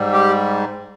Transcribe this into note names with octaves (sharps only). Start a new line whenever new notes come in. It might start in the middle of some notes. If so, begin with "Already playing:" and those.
Already playing: G#2 G3
G4